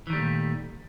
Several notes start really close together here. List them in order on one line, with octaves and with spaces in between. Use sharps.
E3 D#3 G3 A3 A#2